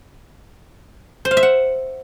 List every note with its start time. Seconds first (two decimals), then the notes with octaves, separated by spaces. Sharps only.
1.25 C5
1.31 F5
1.37 E5
1.43 F#5